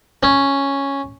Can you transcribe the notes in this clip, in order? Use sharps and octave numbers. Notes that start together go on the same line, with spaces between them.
C#4